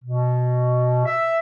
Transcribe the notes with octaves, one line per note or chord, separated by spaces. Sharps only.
B2
E5